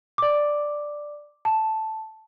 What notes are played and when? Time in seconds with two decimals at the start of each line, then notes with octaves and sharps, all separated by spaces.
0.18 D5 D6
1.45 A5